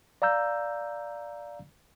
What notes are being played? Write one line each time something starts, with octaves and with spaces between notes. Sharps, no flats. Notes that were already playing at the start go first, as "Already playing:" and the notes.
D5 F5 A#5 E6 G6